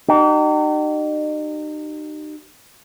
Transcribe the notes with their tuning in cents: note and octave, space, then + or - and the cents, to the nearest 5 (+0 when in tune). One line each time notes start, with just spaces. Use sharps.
D#4 -35 G4 -40